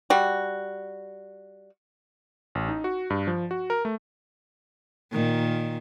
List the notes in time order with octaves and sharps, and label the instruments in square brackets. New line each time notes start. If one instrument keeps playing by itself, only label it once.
[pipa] G3 F#4
[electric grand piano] A1
D#4
F#4
G2
F3
F#4
A#4
A3
[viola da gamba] A#2 D#3